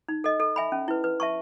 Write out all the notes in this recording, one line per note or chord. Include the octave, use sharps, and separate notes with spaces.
D#4
A4 D#5
A4
E5 G#5 B5
C#4
E4 B4
B4
E5 A5 C#6